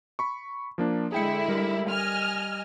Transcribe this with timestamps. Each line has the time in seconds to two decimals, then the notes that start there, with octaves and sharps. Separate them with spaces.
0.19 B5 C#6
0.78 F3 A#3 D4
1.12 D3 G#3 E4 G#4 G5 C#7
1.48 G3 A#4
1.90 D#5 G#5 F6